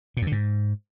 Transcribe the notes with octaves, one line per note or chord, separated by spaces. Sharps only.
A#2
F2
D3
G#2